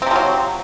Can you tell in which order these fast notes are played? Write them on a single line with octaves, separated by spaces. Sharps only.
C4 C3 F3 F#3